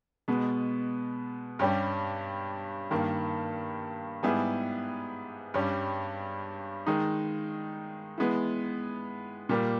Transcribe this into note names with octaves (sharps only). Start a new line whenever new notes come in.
B2 G#3 B3
G2 G3 C#4 G4
G2 D#3 A#3
G#2 G3 B3 E4 G#4
G2 G3 C#4
D#3 G#3 D#4
E3 G#3 B3
A#2 G3 A#3